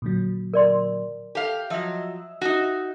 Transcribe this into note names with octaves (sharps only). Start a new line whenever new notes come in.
A#2 D3 F#3
A#4 D5 C6
G4 A4 F5
F3 F#3 D#5 E5 E6
D#4 F#4